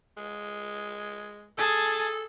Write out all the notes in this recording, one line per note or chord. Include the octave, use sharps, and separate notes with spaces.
G#3
G#4 A4 A5